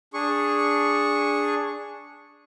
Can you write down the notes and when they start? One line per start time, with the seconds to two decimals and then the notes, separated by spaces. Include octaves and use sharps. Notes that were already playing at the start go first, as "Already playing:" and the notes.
0.14 D4 G#4 C#6